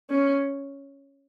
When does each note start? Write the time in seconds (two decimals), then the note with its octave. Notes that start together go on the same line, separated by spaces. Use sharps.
0.10 C#4